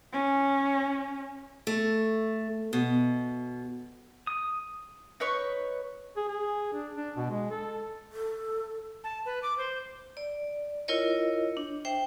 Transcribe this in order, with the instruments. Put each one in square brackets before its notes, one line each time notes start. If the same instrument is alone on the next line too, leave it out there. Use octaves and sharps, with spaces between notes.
[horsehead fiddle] C#4
[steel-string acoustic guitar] A3
B2
[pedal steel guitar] D#6
[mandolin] D#4 B4 C#5 C#6
[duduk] G#4
G#4
D4
D4
B2
G#3
A4
[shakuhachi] A4
[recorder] A5
B4
D6
C5
[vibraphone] D5
E4 F4 A#4 C#5 D#5
D4
C5 E5 G5